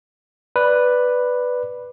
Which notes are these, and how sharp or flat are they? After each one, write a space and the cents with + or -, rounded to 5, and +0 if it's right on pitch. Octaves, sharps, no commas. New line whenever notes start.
B4 +0 D5 +0